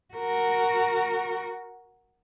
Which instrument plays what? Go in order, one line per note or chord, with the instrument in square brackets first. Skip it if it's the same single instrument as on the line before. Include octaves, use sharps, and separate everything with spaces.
[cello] F#4 A#4